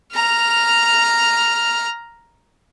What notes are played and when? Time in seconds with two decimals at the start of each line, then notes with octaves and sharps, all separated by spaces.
0.14 A#5 F6